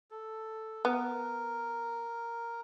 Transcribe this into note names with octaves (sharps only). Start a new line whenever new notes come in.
A4
B3 A#4